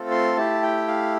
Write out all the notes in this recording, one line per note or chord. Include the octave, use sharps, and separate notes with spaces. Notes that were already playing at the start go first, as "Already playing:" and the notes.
Already playing: A3 C4 F4 A4
C6
A3 E4 G4 A5
G5
F5